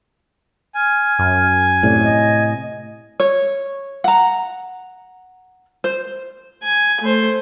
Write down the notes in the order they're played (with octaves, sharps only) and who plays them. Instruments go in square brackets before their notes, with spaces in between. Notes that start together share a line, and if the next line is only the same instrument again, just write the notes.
[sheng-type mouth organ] G#5 [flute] F6
[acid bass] F#2
[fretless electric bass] A2 C3 [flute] D5
[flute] D#5
[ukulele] C#5
F#5 A#5
C5
[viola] G#5
A3 C5